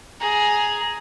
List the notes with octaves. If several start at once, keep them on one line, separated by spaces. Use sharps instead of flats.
G#4 A#5